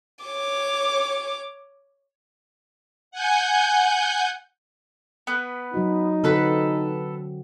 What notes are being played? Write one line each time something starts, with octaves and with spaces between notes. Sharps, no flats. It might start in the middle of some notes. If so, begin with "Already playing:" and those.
C#5 D6
F#5 G#5 G6
B3 B4
F#3 D#4 F#4
D3 C4 F#4 A4 B4 B5